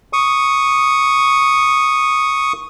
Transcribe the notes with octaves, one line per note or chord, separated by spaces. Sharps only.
C#6 D#6